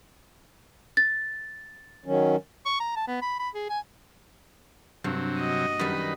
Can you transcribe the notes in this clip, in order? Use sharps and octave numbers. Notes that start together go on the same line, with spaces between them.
A6
D#3 F#3 C#4
C#6
A#5
A5
B3
B5
B5
G#4
G#5
G2 C3 F#3
F#4 D#5
F#2 D#3 G3 B4